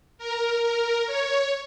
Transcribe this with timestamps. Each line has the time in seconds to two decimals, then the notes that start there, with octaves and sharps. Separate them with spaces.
0.18 A#4
0.62 A#4
1.07 C#5